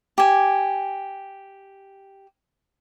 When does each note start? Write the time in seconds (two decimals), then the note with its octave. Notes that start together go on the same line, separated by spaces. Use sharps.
0.18 G4 G#5